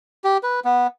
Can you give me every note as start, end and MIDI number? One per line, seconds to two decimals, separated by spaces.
0.24 0.37 67
0.43 0.60 71
0.65 0.87 59